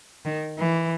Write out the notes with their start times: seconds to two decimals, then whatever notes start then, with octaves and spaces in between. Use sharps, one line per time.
0.25 D#3
0.58 E3